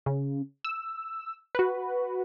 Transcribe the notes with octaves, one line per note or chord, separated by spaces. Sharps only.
C#3
E6
F#4 B4